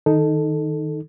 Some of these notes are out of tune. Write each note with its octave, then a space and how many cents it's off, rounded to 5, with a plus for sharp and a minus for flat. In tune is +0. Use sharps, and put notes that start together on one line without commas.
D#3 +0 D#4 +0 A4 +0